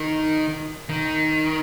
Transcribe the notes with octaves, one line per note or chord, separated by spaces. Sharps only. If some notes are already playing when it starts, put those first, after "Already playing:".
Already playing: D#3
D#3